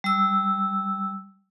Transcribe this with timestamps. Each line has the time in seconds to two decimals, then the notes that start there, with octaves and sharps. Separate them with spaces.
0.04 G3 E6